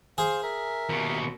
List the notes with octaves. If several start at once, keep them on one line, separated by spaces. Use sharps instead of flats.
G#4 C5 F5
A#4 E5
D#2 B2